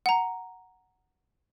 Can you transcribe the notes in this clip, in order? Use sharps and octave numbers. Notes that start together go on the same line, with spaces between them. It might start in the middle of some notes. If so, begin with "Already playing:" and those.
F#5 A#5